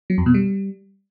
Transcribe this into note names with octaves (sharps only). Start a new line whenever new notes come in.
F#3
F2
B2
G3